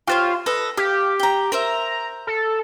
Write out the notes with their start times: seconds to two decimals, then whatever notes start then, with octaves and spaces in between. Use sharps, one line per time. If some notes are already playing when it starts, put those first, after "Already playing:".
0.07 F4 G4 C5 C#5
0.46 A4 B4 D#5 A#6
0.77 G4 F5
1.20 G5 A#5
1.52 A#4 C5 E5 A#5
2.27 A4